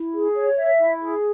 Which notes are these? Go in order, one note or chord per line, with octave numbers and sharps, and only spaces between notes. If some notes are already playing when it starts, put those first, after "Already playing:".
Already playing: E4
G#4
C#5
E5
E4
G#4